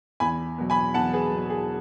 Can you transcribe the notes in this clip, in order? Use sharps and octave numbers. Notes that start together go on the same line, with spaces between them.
E2 G#5 B5
B2 F#3
G#5 B5
E2 F#5 A5
G#4 B4
B2 F#3
G#4